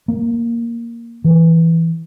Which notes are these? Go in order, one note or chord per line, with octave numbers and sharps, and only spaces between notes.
A#3
E3